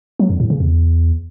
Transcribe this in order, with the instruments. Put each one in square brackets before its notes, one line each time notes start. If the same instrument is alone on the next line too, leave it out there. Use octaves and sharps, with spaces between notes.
[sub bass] F#3
F2
A2
C#3
E2